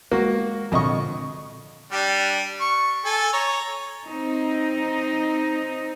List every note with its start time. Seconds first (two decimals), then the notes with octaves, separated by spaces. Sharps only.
0.11 G#3 A#3 F#4
0.72 F2 A#2 D3 D#5 C#6
1.92 G3 D4 G4
2.61 C#6
3.05 A4 G#5
3.33 C#5 A#5
4.10 C4 D#4